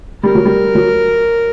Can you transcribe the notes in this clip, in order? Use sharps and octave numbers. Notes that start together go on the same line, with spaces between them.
G3 A#4
F#3
G3
F#3